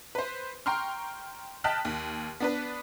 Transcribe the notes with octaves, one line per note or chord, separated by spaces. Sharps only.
B4 C5
G5 A#5 C6 C#6 F6
D#5 G5 A5 F6 F#6 B6
D#2
B3 D4 B4